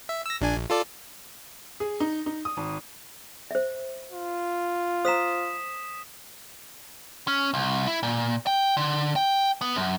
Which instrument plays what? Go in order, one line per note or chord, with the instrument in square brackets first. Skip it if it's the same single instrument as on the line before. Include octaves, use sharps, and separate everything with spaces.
[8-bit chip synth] E5
E6 A#6
A#1 D4 G#5
A#1
F4 A4 D5
[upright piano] G#4
D#4
D#4
D#6
G#1
[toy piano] C5 E5
[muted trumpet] F4
[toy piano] C5 A#5 [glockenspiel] D#6 B6 E7
[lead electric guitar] C#4
C2
E4
A#2
G5
D3
G5
B3
F#2